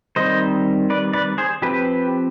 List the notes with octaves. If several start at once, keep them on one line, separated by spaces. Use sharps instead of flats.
D#3 G3 C4 C5 D#5
B4 D5
B4 D5
G#4 C5
F3 C4 G4 B4